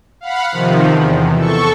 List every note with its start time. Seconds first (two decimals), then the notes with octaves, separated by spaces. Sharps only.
0.21 F5 F#5 B5
0.52 C3 D#3 F3
0.91 E2
1.36 A4 C#6